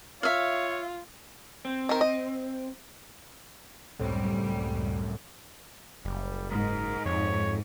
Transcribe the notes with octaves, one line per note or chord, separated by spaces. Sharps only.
F4 C#5 E5 F5
C4
D#3 A#4
D#5
C#2 F#2 A2 G3 C4
F#1 G3
G#2 A#4
F2 C#5